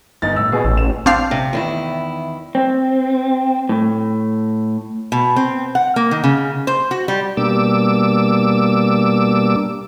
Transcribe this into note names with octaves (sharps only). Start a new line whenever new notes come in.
G1 D#4 A6
A2 E6
B2 G#4
A1 E6
E7
C4 D4 F5
C3
E2 D#3 E4
C4
A2
B2
C4
F#5
A#3
D#3
C#3
C5
F#4
G3
B2 G3 A#3 D4 D6 E6